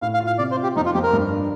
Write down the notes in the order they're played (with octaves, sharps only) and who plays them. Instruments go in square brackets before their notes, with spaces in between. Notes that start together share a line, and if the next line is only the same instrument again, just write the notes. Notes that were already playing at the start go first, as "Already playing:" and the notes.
[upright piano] A2 [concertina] F5
[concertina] F5
[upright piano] F4
[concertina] F5
[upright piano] C3 [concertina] D5
[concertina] C5
[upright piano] F4
[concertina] G4
[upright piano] F2 [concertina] D#4
[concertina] F4
[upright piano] F2 [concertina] G4
[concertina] A#4
[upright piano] G2
D4